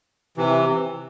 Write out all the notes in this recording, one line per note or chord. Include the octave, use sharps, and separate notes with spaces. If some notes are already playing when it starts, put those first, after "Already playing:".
C3 E3